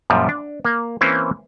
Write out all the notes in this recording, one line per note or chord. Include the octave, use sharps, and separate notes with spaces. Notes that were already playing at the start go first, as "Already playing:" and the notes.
F#2 A#2 F3 G3
D4
A#3
E3 A#3 C4 C#4 E4